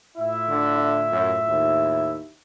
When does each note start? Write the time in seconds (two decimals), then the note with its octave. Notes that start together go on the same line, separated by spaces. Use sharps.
0.16 A2 E4 F4 E5
0.49 D3
0.77 E4
1.12 F#2
1.48 D#2 E4